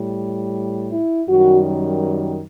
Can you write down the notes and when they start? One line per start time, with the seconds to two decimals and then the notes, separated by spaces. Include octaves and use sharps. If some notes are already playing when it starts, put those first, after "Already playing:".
Already playing: A2 G3
0.92 E4
1.28 F#2 D#3 G3 F#4